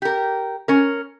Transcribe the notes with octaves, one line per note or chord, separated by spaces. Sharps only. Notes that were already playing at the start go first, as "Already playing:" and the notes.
G4 A#4
C#4 A#4